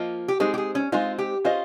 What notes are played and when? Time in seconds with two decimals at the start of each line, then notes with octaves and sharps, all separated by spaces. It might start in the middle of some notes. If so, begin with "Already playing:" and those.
Already playing: F3 A#3 F4 D#5
0.28 G4
0.40 G#3 C4 D#4 G#4
0.54 G4
0.58 G#4
0.75 C#4
0.92 G#3 C4 D#4 F4
1.18 G4
1.45 C#4 F4 G#4 C5 D#5